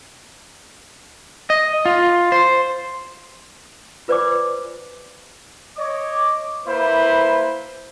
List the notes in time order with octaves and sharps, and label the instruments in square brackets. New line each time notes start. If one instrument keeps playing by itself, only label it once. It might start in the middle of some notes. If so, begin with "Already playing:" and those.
[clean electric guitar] D#5
F4
C5
[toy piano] F4 B4 C5 D5 G#5 D6
[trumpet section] C#5 D#5 D6
A#3 E4 B4 C5